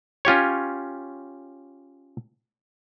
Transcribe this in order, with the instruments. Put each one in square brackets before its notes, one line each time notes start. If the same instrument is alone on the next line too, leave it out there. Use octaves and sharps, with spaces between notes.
[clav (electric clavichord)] C#4 F4 G4 C#5